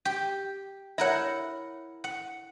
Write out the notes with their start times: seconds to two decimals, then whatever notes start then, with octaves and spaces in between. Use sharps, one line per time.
0.05 G4
0.98 E4 A#4 C#5 E5 F#5
2.04 F#5